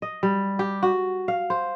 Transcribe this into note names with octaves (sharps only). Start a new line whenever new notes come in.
D#5
G3
G4
F#4
F5
C5